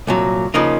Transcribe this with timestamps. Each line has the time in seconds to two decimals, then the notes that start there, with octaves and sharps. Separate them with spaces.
0.07 C2 A#2 F#3
0.54 C#3 F3 A#3 D#4